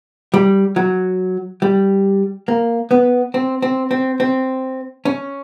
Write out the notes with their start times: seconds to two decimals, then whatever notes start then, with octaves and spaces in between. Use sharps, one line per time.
0.34 G3
0.76 F#3
1.62 G3
2.48 A#3
2.91 B3
3.34 C4
3.62 C4
3.91 C4
4.20 C4
5.05 C#4